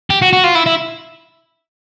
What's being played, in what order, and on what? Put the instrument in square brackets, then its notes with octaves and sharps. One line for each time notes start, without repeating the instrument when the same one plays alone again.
[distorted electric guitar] G4
F#4
F#4
F4
E4
E4